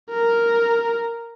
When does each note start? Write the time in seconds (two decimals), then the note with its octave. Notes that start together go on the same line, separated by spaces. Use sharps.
0.10 A#4